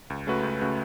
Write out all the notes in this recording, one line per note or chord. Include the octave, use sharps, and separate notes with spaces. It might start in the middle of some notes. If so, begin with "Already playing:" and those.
C#2
C#3 A3 F#4 B4
C#2
C#3 A3 F#4 B4